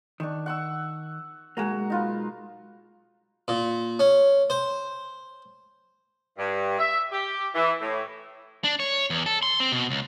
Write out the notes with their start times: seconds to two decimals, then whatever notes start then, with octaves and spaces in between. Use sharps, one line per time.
0.20 D#3 D4 C#6
0.46 F#5 C#6 E6
1.57 B1 G#3 A#3 F#4 A#5
1.90 D#4 F4 B4
3.48 A#2
3.99 C#4
4.50 C5
6.38 G2
6.79 E5
7.12 G4
7.55 E3
7.81 A2
8.64 D4
8.80 C#5
9.10 E2
9.26 A4
9.43 C6
9.60 C4
9.72 B2
9.90 C#2